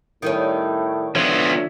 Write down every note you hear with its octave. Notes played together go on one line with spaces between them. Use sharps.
A2 D#3 G3 C#4
D3 F3 B3 C#5 E5